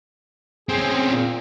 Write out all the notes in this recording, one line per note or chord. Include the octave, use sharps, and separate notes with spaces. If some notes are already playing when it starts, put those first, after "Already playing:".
C4 C#4 G#4
A#2